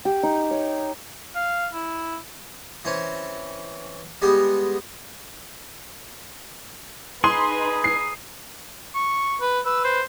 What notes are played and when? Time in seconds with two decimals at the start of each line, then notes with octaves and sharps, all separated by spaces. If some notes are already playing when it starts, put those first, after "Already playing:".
0.05 G4
0.23 D#4
0.51 C#5
1.36 F5
1.74 E4
2.85 E3 C4 C#4
4.22 G3 G#3 B3 G4
7.24 D#4 G#4 B4 C6
7.84 C7
8.95 C#6
9.41 B4
9.66 B4 E6
9.85 C5